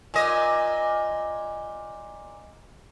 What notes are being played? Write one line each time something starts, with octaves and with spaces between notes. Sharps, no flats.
A#2 D#5